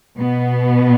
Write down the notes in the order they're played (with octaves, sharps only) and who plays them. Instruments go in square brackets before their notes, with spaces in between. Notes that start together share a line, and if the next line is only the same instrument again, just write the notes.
[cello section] B2 B3